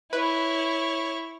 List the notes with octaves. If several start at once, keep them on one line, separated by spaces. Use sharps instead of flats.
E4 B4 C#5